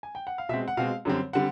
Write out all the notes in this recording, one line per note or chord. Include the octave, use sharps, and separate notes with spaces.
G#5
G5
F#5
F5
B2 G#3 C4 E5
F#5
B2 G#3 C4 F5
F#2 D3 G3 C4
D3 G3 C4 F#5